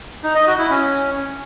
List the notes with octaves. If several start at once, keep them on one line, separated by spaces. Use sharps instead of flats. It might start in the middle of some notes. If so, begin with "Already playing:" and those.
D#4
D#5
F#4
E4
C#4